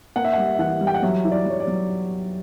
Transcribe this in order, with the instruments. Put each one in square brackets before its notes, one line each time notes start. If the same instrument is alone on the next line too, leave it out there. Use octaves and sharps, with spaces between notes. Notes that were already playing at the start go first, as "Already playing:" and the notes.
[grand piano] A#3 F#5
E5
F#5
G3
E5
E3 F#5
G3
G5
F#5
F#3 E5
E4
D5
F#3 C#5
D5
F#3